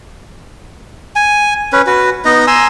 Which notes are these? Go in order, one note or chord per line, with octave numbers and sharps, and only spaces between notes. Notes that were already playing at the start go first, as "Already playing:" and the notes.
G#5
C#4 B4
F#4 B4
B3 D#4 D#5
G#5 A#5 C6 E6